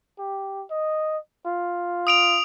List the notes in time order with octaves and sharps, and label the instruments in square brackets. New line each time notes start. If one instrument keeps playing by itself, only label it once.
[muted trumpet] G4
D#5
F4
[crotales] D#6 D7 F7